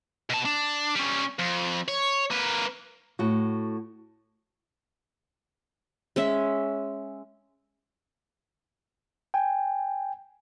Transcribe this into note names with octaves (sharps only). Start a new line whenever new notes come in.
B2 A5
D4
G3 C#4
F2
C#5
A#3 B4
A2 F#4
G#3 C#4 E5
G5 G#5